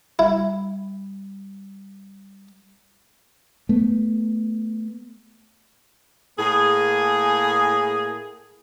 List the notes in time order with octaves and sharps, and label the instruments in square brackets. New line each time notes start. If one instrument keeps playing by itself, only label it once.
[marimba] G3 [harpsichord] E4
[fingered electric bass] A3 B3
[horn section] A2 A#3 G#4